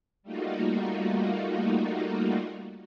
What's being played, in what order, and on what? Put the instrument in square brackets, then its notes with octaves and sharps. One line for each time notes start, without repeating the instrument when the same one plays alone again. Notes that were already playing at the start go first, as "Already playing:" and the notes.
[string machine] G3 A3 A#3 D#4 F4 F#4